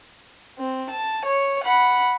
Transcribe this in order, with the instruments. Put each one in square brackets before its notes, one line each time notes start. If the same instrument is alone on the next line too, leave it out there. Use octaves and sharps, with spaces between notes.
[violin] C4
A5
C#5
F#5 B5